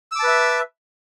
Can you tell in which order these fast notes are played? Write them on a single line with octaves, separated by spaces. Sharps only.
E6 D6 A5 B4 E5